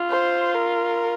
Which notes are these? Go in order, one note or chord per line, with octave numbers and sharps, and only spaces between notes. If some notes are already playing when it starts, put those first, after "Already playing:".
Already playing: F4
C5
A#4